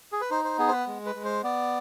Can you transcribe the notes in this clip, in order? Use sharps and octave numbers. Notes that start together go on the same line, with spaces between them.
G#4
B4
D#4 C5
C5
B3 G#4
C5
B4
G#3
B4
G#3
C5
B3 D5